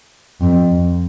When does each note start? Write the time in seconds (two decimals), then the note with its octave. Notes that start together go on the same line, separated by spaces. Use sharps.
0.41 F2